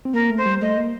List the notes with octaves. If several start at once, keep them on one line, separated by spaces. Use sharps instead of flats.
C4
A#3 A#4
A3
C5
G3
A3 D#5
A#3